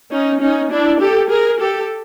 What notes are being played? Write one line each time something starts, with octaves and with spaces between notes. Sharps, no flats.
C#4 D#4
C#4 D#4
D4 E4
G4 A4
G#4 A#4
G4 A4